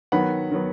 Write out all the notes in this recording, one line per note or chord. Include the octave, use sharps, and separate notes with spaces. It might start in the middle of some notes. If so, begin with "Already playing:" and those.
D#3 F#3 B3 F#5 B5
D#3 F#3 B3